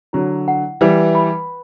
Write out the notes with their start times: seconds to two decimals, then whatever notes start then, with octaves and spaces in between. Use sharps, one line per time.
0.13 D3 F#3 E4
0.48 F#5
0.81 E3 G3 B4
1.15 B5